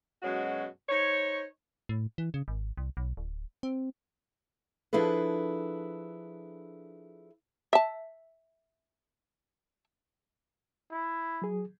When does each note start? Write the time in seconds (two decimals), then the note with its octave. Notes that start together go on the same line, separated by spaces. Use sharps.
0.22 F#2 B2 F#3 G#3 F#4
0.89 D#4 C5 C#5
1.89 A2
2.18 E3
2.34 C#3
2.48 G#1
2.77 C2
2.97 B1
3.17 D1
3.63 C4
4.93 F3 D4 E4 G#4 A4 B4
7.73 E5 A5
10.91 E4
11.42 F#3 G#4